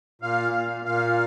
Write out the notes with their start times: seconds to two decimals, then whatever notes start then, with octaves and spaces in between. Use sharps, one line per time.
0.22 A#2 F5
0.53 A#2
0.84 A#2 F5